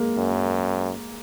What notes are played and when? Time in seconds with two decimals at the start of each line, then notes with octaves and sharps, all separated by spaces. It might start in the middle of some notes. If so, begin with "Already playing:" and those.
Already playing: G#3 A#3
0.17 F#2